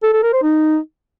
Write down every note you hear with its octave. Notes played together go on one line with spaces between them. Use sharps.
A4
A4
A#4
C5
D#4